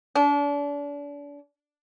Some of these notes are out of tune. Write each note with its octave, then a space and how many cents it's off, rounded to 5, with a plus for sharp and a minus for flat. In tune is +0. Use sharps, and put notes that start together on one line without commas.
D4 -35